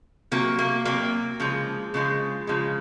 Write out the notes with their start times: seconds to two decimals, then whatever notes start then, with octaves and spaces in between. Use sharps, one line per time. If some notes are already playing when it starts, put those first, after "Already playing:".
0.31 C3 F#3 A#3
0.59 A#3
0.85 C3 F#3 A#3
1.40 C#3 F3 G#3
1.94 C#3 F3 G#3
2.47 C#3 F3 G#3